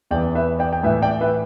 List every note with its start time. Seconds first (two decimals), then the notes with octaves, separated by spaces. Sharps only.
0.11 E2 E3 D5 G5
0.35 B4 E5
0.59 D5 G5
0.73 G5
0.83 A2 E3 B4 E5
1.02 D5 G5
1.21 B4 E5